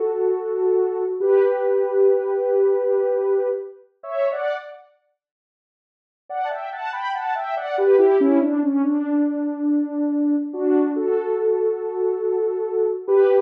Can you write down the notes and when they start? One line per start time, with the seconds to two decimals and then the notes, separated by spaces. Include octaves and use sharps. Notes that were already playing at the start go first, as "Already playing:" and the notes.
Already playing: F#4 A4
1.20 G4 B4
4.03 C#5 E5
4.31 D5 F#5
6.29 D5 F#5
6.45 A5
6.50 E5 G5
6.72 F#5 A5
6.93 G5 B5
7.14 F#5 A5
7.35 E5 G5
7.57 D5 F#5
7.78 G4 B4
7.99 E4 G4
8.20 C#4 E4
8.41 D4
8.63 C#4
8.83 D4
10.53 D4 F#4
10.96 F#4 A4
13.07 G4 B4